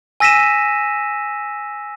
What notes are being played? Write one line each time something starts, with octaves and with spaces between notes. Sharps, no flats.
G#5 E6 A#6 B6 D#7 E7